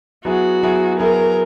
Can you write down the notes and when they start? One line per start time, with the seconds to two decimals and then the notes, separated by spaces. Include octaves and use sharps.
0.25 F#3 B3 E4 F#4 G#4
0.63 F#3 B3 E4 G#4
0.99 F#3 B3 E4 G#4 A#4